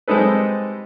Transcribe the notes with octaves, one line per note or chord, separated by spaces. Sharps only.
G3 G#3 C4 D#4 A4 B4